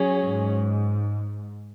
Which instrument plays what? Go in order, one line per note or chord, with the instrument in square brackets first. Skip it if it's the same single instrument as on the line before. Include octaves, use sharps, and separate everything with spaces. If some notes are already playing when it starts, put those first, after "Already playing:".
Already playing: [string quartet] F#3 C#4 G#4
[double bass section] G#2